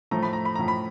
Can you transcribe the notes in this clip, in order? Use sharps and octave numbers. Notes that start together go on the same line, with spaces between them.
A2 F3 A3 A#5
B5
A#5
B5
A2 F3 A3 A#5
B5